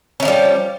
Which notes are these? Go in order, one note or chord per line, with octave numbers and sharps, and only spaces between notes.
E3 F3 G3 C#4